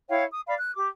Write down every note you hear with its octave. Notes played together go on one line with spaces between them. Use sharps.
E4 C#5 F5 G5
D#6
D5 F5 B5
F#6
G4 D6